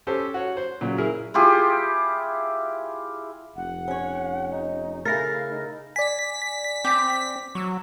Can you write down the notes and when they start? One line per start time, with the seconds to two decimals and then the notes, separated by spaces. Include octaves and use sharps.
0.07 C#4 G4 A4 C5
0.34 F#4 C#5
0.57 C5
0.81 A#2 C#3 F#3
0.98 E4 G#4 A#4
1.34 E4 F4 G4 G#4
3.56 F1 F#5
3.88 C#4 C#5
4.51 D#4
5.05 C#3 A3 E4 A#4 F5 A6 A#6
5.50 D#4
5.96 D5 G#5 B6
6.85 C4 G4
7.55 F#3 C#6 E6